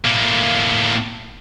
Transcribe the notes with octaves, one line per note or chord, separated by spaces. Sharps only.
A2 A#3